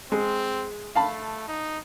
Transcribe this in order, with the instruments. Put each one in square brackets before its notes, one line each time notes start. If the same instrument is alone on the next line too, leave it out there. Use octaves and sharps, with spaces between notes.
[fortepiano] G#3 [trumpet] C4
[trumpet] A3 [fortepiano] F5 A5 B5
[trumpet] D#4